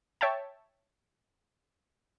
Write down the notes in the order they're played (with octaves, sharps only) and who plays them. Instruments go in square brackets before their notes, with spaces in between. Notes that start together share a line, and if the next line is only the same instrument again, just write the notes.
[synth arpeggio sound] C#5 E5 G5 A5